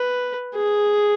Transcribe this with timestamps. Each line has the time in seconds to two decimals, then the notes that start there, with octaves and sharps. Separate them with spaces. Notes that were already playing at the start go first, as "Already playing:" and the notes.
Already playing: B4
0.55 G#4